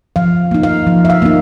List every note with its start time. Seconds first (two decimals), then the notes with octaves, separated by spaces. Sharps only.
0.16 F3 F5
0.51 A#3 D#4
0.63 F5
0.87 F3
1.05 E5
1.10 F5
1.22 A#3 D#4